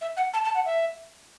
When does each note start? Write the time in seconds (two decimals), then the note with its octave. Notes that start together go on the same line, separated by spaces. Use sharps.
0.01 E5
0.16 F#5
0.33 A5
0.44 A5
0.54 F#5
0.65 E5